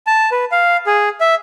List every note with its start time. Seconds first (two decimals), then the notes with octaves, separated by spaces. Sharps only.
0.07 A5
0.31 B4
0.52 F5
0.87 G#4
1.20 E5